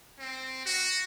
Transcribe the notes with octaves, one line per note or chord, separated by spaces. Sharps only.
C4
F#4